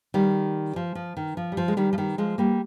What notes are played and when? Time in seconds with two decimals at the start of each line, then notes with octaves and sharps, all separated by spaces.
0.14 D#3 G3
0.76 F3
0.95 F3
1.17 D#3
1.37 F3
1.52 G3
1.57 F3
1.68 G#3
1.77 D#3 G3
1.93 F3
1.98 D#3 G3
2.18 F3 G#3
2.38 G3 A#3